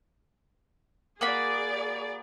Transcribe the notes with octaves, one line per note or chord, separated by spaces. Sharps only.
A#3 F#4 G#4 D5 B5